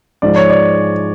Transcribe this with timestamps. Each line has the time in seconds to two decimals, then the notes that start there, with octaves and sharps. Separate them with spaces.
0.22 G#2 F3 D5
0.36 C#5
0.50 D5